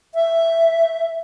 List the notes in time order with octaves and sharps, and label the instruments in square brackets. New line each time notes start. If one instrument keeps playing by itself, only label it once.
[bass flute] E5